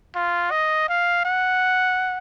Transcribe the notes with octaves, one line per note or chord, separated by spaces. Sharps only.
F4
D#5
F5
F#5